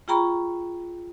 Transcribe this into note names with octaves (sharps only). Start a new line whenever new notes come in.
F4 G#4 G5 A#5 B5 C#6